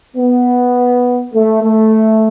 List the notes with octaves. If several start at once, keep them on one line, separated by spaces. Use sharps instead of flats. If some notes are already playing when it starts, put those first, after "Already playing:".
B3
A3
A3